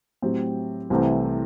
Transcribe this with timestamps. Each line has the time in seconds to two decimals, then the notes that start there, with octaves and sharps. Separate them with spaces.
0.22 A2 F#3 C4 G4
0.90 C2 C3 E3 A3 C4